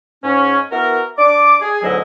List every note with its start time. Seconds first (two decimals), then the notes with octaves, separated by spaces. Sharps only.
0.23 G#2 C#4
0.72 B3 E4 F#4 A#4
1.18 D4 D5 D6
1.61 G#4
1.83 D2 G#2 B2 F#3 E4 D#5